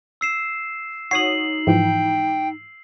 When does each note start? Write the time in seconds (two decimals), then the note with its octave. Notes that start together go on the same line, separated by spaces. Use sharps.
0.21 E6 C7 E7
1.11 D#4 F#4 C#5 D#6 C7 F#7
1.67 G#2 E3 F3 G5